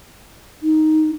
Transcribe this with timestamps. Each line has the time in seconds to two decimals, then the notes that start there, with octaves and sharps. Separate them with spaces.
0.63 D#4